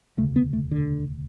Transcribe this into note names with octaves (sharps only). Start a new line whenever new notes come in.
E1 D2 C#3 A3
B3
A3
D3